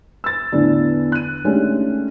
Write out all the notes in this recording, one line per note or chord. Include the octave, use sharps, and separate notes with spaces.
E6 A6
E2 A2 D3 E3 B3 D4
F#6 D#7
D#3 G#3 A3 C#4 D4 G4